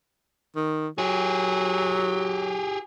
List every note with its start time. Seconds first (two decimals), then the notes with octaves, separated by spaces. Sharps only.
0.56 D#3
0.98 F#3 G4 G#4